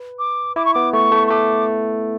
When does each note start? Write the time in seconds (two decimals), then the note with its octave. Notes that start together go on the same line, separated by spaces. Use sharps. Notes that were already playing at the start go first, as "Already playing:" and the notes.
Already playing: B4
0.19 D6
0.56 E4 D6
0.65 C#6
0.74 B3 D6
0.93 A3 C#6
1.12 A3
1.27 C#6
1.31 A3 D6